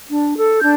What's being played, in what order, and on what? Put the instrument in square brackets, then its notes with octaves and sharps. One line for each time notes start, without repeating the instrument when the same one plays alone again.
[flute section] D4
A4
D4 G6